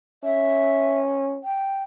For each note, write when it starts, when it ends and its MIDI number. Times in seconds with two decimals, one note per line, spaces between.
0.24 1.39 61
0.24 0.99 76
1.44 1.83 79